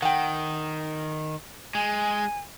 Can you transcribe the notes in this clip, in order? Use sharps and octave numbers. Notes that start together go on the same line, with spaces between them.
D#3 F#5 G5
G#3 G#5